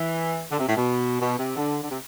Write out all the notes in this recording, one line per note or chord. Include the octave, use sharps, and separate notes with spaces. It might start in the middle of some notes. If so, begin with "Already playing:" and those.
Already playing: E3
D3
C3
A2
B2
B2
C3
D3
D3
C3